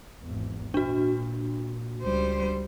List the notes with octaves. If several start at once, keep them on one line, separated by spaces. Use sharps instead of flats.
G#1 E2
A#2 D4 F#4
C#2 G3 C5